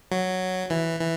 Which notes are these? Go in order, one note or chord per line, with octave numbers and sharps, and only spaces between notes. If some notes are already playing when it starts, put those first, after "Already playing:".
F#3
E3
E3